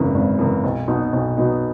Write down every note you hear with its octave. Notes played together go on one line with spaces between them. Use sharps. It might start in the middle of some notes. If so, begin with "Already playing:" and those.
Already playing: G#1 F#2 C#3 E3
G#1
F#2 C#3 E3
B1
B2 F#3 B3 D#4
B1
B2 F#3 B3 D#4